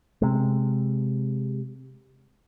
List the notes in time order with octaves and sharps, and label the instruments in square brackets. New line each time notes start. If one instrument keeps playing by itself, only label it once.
[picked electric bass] C3 G#3